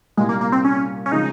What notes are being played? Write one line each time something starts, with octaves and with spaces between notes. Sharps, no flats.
C2 A#2 G3 G#3
A#3
A#3
C4
C#4
C#4
C#3 F3 G#3 D#4